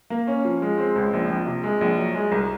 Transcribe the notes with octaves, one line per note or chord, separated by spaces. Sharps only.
A#3
C#4
F3
G#3
C4
C#2
A#1
A#1
C3
G#3
A#1
F#3
G#3
C2